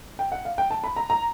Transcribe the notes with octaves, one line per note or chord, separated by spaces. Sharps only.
G5
F#5
F5
G5
A5
B5
A#5
A#5